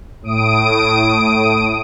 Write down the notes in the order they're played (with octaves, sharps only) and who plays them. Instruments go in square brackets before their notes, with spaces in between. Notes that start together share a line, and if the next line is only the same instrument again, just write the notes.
[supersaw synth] A2 D#6 D7